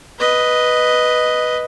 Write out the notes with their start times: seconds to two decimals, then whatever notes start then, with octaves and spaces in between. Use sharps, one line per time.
0.19 B4 D#5